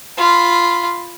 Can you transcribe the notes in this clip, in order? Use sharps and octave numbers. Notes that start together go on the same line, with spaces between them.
F4 B5